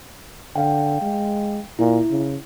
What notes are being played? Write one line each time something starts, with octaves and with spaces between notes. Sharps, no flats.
D3 F5 G5
G#3
A#2 E4
C#3